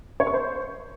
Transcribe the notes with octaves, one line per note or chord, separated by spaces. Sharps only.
C#5
C#6
C5